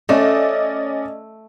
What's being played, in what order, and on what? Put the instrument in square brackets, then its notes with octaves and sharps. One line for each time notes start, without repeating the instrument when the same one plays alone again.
[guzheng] A3 [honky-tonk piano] C#4 D5 D#5